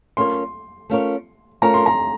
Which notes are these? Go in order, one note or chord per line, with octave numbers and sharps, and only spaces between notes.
A3 C#4 F4 A#4 C#5 C6
A3 C#4 F4 A#4 C#5
A3 C#4 F4 A#4 C#5 A#5
C6
A#5